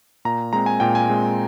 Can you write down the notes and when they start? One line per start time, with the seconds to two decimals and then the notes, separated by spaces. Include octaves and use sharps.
0.25 A#2 A#5
0.53 G#3 C4 A#5
0.66 G#5
0.80 A#2 G5
0.95 G#5
1.09 G#3 C4